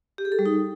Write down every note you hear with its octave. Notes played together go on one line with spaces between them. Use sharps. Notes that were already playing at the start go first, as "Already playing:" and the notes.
G4
G#4
A4
G3
D#4